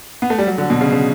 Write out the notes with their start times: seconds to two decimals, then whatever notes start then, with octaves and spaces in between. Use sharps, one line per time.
0.22 B3
0.30 A3
0.38 G3
0.47 F#3
0.58 D3
0.70 B2
0.81 C#3
0.93 C#3